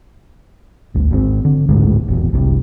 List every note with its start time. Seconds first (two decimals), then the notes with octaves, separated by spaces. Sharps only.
0.94 G#1 D2
1.10 G#1 B2 C4
1.45 D3
1.68 A1 D2 G#2 G#3
2.08 E1 A#1
2.32 F#1 C2 C3